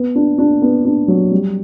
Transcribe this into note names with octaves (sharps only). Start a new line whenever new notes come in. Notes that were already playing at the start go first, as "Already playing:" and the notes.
Already playing: B3
D4
D4
B3
D4
F#3
G3